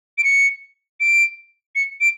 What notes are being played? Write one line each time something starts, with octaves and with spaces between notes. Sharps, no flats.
D7
C#7
D7
C#7
D7